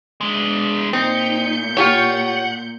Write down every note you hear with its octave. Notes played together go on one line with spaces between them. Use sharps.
G#3 D4
A#2 C4 D#4 G6 C#7
F4 G4 C#5 F#5